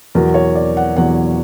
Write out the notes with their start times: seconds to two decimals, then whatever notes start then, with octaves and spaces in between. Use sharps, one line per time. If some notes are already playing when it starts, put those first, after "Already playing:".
0.15 E2 B2 F#3 A#4
0.34 C#5
0.55 D5
0.77 F#5
0.97 E2 B2 F#3 F#5